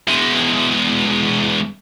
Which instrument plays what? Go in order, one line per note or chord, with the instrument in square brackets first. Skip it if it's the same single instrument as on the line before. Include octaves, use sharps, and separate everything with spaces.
[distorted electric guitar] E2 G#3